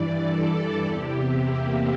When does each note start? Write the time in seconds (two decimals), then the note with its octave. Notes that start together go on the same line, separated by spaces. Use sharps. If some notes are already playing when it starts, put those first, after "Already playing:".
Already playing: G2 E3 D5
0.21 A4
0.53 A4
0.85 E2 C3 E3 G4
1.17 E4
1.48 A#3